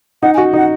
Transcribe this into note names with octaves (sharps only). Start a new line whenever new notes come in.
D#4 F#5
G#5
F#4
D#4 F#5